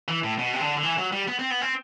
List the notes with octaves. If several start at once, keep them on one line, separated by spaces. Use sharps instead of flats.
E3
A2
B2
C3
D3
D3
E3
F#3
G3
B3
C4
B3
C4